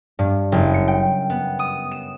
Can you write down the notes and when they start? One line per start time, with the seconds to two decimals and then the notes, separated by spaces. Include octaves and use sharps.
0.19 G2
0.52 F#1
0.74 C#7
0.88 G5
1.30 B3
1.59 D#6
1.91 E7